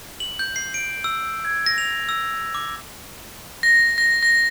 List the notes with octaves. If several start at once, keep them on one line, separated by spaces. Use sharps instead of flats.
F#7
G6
C7
D7
E6
G#6
A#6
F7
E6
D6
A#6
A#6
A#6